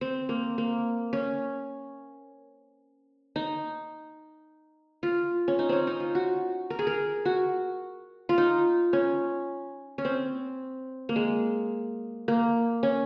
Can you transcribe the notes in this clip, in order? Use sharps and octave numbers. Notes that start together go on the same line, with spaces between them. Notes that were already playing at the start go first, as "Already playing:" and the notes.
C4
A#3
A#3
C#4
D#4
F4
C#4
D#4
C4 C#4
D#4
F4
F#4
A#4
G#4
A#4
F#4
F4
D#4
C#4
C#4
C4
A#3
G#3
A#3
C#4